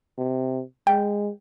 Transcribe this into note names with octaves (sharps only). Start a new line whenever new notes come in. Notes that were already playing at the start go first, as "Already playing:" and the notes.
C3
G#3 G5